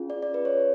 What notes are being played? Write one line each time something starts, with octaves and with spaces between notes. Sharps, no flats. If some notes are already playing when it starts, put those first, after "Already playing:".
Already playing: C#4 F4 G#4
D5
D5
B4
C#5